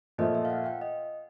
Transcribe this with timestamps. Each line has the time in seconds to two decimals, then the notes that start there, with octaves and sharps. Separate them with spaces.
0.18 A#2 F3 A3 D#5
0.35 E5
0.45 F5
0.50 F#5
0.66 G5
0.81 D#5